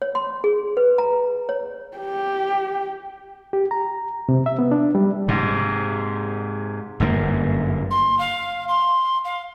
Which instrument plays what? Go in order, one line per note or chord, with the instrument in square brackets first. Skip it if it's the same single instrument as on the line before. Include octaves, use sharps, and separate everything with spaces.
[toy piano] C#5
C6
G#4
B4
A#5
C#5
[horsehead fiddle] G4
[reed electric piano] G4
A#5
C3
E5
B3
D4
G3
[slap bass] G#2 C3
G1 F#2 C3 A#3
[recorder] C6
F5
C6
F5